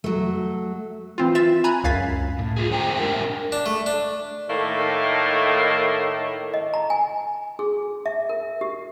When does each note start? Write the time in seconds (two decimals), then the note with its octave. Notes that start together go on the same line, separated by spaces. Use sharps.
0.04 F#3 A3
1.18 E3 C4 F4
1.35 F4 E5 A6 E7
1.64 G#5 A#5 B5 F#6 G#6
1.84 C#2 F#2 F5 G#6 A6 B6
2.39 A2
2.56 F4 G#4
2.70 F2 G#3 C5 G5 A#5
2.96 D4 G4 A#4 E5 G5
3.52 D4
3.66 A3
3.86 D4
4.49 A2 D#3 A3 A#3
6.54 D#5
6.74 A#5
6.90 G#5
7.59 G#4
8.06 E5
8.29 A#4
8.61 G4